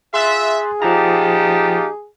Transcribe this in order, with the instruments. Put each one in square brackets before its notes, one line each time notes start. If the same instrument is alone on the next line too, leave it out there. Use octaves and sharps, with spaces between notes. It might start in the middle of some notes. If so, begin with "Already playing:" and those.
[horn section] F4 E5 [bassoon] G#4 [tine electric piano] C6 F#6 A6
[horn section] A#2 F#5 A5 [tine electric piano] F3 A#5 [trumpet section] D#4 F4 G4